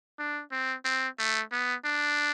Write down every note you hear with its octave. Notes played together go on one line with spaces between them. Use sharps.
D4
C4
C4
A3
B3
D4